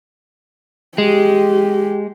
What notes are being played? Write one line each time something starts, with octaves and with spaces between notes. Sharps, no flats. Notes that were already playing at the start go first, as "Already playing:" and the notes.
G#3 G4